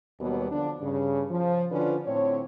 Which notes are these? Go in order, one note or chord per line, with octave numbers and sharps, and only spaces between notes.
D#2 B2 F#3 G3 B3
D3 F3 D4
G2 C#3
F3
D3 C#4 D4 F4 B4
A2 D3 C4 C#5